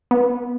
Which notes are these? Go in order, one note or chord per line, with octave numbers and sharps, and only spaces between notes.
B3